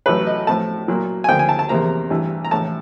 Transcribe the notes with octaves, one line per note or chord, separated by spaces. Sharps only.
A1 A2 F#3 A3 B4
D#5
A2 F3 A3 A5
A#2 F#3 A#3
G#5
D2 D3 F3 A#3 D4 G5
G#5
A5
A5
E2 C3 F3 A#3 A#5
A1 G2 E3
A#5
A#1 A2 E3 A5